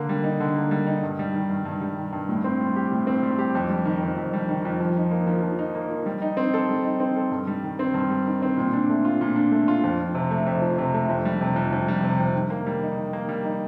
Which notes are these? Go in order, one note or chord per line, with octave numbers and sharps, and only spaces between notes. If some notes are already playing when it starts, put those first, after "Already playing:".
Already playing: D3 A#3
G3
D#4
D3
A#3
G3
D#4
G2
G3
D#3
G2
G2
G3
D#3
G2
A2
C4
G3
G4
A2
C4
G3
G4
F2
G3
D#3
F2
F2
G3
D#3
F2
F3
D#4
A#3
F3
F3
D#4
A#3
F3
G3
D#4
C4
A4
G3
D#4
C4
A4
G2
G3
D#3
C4
G2
G3
D#3
C4
A#2
D4
A3
F4
A#2
D4
A3
F4
F2
F3
C3
A3
F2
F3
C3
A3
F2
G3
C3
F2
F2
G3
C3
F2
D#3
A#3
G3
D#4
D#3
A#3
G3
D#4